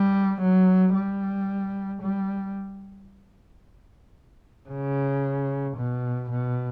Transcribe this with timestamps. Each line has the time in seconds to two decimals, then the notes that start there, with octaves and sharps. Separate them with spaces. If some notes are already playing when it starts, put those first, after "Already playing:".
Already playing: G3
0.41 F#3
0.94 G3
2.02 G3
4.69 C#3
5.76 B2
6.30 B2